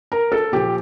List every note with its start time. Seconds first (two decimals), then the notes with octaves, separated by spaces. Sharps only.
0.12 A#4
0.32 A4
0.52 A#2 F3 G4